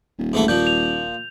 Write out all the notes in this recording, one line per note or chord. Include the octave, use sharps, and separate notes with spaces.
D#1
G#2 E3 A3
A#2 F3 G6
F7